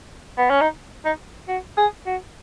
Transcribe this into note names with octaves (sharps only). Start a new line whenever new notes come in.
B3
C#4
D#4
D#4
F#4
G#4
F#4